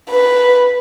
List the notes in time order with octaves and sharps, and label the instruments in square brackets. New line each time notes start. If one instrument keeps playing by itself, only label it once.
[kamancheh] B4